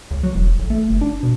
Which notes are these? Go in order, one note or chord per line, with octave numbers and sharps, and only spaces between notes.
C#2
F#3
E1
A1
A3
G1
D4
B2